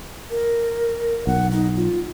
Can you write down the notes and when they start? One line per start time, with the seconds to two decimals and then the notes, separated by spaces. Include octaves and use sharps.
0.30 A#4
1.27 B1 F#5
1.51 D#4
1.76 F4